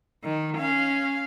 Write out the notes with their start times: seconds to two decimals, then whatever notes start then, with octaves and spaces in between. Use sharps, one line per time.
0.23 D#3
0.58 C#4 F5